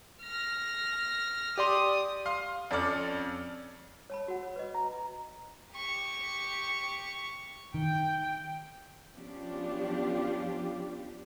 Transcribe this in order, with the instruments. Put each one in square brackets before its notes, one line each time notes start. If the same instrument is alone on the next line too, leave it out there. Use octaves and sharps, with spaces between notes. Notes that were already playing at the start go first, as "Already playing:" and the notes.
[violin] F6 A#6
[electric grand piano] G4 D5 C6 [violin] D#6
[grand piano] F5 C6
F2 C#4 A4 D5 F6
[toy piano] C#5 A5 B5
F#4 F#5
C#5
B4 D#5
[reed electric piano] A#5
[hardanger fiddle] G4 C#6
[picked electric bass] D#3 [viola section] G5
[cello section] F3 B3 C#4 D4 F4 G4